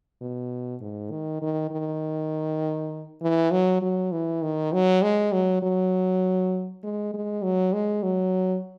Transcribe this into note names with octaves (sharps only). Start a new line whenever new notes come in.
B2
G#2
D#3
D#3
D#3
E3
F#3
F#3
E3
D#3
F#3
G#3
F#3
F#3
G#3
G#3
F#3
G#3
F#3